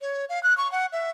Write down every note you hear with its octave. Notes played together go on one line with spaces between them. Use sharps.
C#5
F5
F#6
C#6
F#5
E5